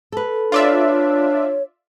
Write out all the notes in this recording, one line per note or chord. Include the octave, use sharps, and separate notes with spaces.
A4 B4
D4 F4 C#5 D5 E5